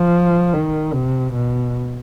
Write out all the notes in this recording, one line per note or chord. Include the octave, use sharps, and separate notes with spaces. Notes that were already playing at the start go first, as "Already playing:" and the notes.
Already playing: F3
D#3
C3
B2